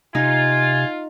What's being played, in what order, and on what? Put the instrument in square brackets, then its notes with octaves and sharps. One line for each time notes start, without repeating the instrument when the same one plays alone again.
[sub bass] C3 [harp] D#4 [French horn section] F4 [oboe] G#5